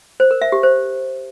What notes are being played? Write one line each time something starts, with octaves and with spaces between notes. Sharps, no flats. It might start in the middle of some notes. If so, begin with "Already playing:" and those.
C5
A#4
E5
G4
C5